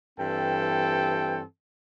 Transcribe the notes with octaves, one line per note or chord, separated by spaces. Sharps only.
G2 E3 C4 A4 G5